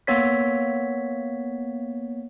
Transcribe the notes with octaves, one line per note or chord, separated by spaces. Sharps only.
A#3 B3 C#5 B6